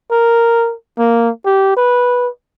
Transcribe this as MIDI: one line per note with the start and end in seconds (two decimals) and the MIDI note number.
0.11 0.74 70
0.99 1.30 58
1.45 1.74 67
1.77 2.29 71